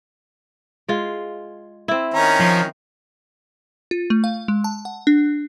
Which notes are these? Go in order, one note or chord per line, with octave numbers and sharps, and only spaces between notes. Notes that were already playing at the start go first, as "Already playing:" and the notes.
G#3 F4
C4 E4
D#3 C#4 A#5
F3
F4
A3
F5
G#3
A5
F#5
D4